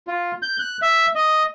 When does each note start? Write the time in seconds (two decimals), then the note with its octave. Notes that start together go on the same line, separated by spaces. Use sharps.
0.07 F4
0.42 G6
0.59 F#6
0.82 E5
1.15 D#5